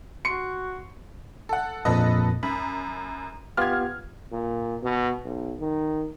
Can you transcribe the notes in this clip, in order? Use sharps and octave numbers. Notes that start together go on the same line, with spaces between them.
F#4 C6 C#7
A4 F#5
A#1 F2 A#2 A4 B4 D#5
F#2 B5
B3 F4 G4 F6 G#6
A#2
B2
B1
D#3